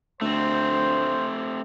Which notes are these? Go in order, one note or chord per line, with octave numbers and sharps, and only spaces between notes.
D2 A3 C4 C5